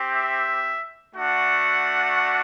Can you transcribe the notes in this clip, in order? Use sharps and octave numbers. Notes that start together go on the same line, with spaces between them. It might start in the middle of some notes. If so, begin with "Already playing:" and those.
Already playing: C4 G4
E5
A3 D4 F#4 F#5